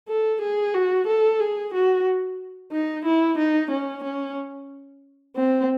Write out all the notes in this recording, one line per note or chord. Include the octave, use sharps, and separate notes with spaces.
A4
G#4
F#4
A4
G#4
F#4
D#4
E4
D#4
C#4
C#4
C4